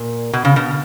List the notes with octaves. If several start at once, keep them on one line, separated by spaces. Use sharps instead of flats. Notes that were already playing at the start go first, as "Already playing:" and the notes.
Already playing: A#2
B2
C#3
B2